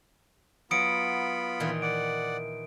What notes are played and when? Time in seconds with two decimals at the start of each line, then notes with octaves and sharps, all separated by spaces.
0.71 F#3 B3 F4 B5 D#6 C#7 D7
1.60 A#2 D#3 E3
1.82 D5 F#5 D7